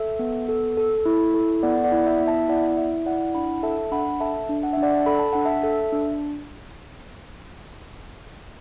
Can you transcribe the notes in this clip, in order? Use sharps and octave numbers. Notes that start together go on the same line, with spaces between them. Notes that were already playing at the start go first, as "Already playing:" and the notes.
Already playing: A4 E5
B3
A4
A4
E4
A4
B3 D5 F#5
D5 F#5
E4
E5
B3
E5 A5
E4 D5 F#5
E4 E5
E4 D5 F#5
D4 F#5 B5
A4 E5 A5
D4 F#5 B5
A4 E5 A5
D4
F#5
D4 E5
D5 F#5
A4 B5
A5
D4 F#5
E5 A5
A4
D4